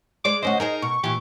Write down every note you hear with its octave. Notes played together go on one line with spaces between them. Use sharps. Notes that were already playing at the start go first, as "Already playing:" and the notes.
G#3 C5 D5 D6
D2 C#4 F#4 C5 D#5
D#4 G#4 A#4 C5 D#5
B2 C#6
A#2 E3 G4